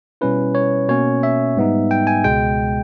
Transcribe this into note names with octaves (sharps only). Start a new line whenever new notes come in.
B2 G3 C#4 E4 B4
C#5
B2 A#3 C#4 C#5
E5
G#2 G3 B3 D#4
G5
G#5
C#2 B2 G#3 G5